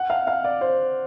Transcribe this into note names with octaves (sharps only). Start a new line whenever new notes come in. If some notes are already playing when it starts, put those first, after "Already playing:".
Already playing: F#5
F5
F5
D5
C5